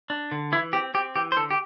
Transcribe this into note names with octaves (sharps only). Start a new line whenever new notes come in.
D4
D3
E3 E4
C4 G4
C4 G4
E3 G4
C5
D3 A4
G4